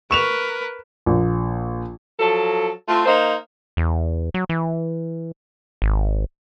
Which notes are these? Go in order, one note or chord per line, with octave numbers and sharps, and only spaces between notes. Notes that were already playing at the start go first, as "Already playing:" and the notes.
A#4 B4 C#6 E7 F7
A#1
F3 F#3 A4
A3 C4 F4
A#3 D#4 C5
E2
F#3
E3
G#1